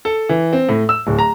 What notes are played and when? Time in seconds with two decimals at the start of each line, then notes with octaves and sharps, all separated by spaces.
0.05 A4
0.29 E3
0.53 C4
0.69 A2
0.89 E6
1.07 D1
1.19 A#5